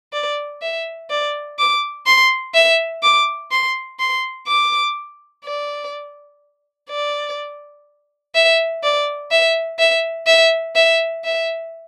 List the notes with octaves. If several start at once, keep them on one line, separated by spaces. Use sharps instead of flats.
D5
E5
D5
D6
C6
E5
D6
C6
C6
D6
D5
D5
E5
D5
E5
E5
E5
E5
E5